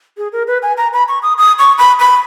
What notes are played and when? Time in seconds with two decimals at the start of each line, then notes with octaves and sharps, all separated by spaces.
0.17 G#4
0.32 A#4
0.47 B4
0.63 G#5
0.77 A#5
0.93 B5
1.08 C#6
1.23 D#6
1.38 D#6
1.59 C#6
1.78 B5
1.99 B5